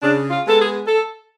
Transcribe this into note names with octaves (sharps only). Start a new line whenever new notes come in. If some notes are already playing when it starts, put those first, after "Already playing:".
C#3 D4
F4
G#3 B3 A4
G#4
A4